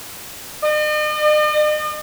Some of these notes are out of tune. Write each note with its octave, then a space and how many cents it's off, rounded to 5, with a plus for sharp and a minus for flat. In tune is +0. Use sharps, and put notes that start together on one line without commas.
D#5 -45